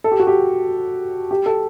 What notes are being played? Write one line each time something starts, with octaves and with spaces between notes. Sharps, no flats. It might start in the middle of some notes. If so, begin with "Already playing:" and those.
A4
G4
F#4
G4
G4
A4